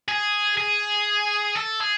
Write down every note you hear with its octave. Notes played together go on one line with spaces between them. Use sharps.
G#4
G#4
A4
G#4